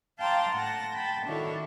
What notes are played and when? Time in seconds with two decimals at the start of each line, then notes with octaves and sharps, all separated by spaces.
0.18 F5 G5 A5 A#5 C6 D6
0.53 A2 F#5 A5 A#6
0.94 G5 A5 B5
1.26 D#3 D4 E4 F#4 A4 C#5